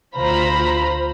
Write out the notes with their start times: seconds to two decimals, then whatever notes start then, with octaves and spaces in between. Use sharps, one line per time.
0.17 D2 F4 C5 A#5 B5